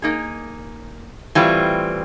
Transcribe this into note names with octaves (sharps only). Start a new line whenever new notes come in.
A#3 D#4 G#4
A2 E3 G3 C4 F4